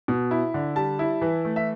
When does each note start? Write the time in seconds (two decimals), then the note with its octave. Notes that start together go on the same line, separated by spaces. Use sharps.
0.08 B2
0.31 E4
0.54 D3
0.76 G3 A5
0.99 E4
1.22 E3
1.45 A3
1.56 E5